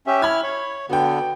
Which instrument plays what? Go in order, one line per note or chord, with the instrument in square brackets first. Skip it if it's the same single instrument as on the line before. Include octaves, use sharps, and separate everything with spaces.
[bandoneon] C#4 G4 E5
[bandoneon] E4 F6 [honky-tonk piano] B5 G#6
[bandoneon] C#5
[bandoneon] D3 B3 [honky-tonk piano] F#4 G5